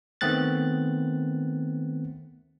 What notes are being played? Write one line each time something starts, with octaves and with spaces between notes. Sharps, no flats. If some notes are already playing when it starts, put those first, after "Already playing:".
D#3 A3 B3 C4 F#6 A6